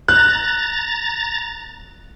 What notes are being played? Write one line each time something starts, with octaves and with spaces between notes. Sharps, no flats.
A#5 F#6 A6